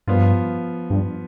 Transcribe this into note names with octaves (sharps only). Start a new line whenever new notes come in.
G2 F3 B3 F4
G2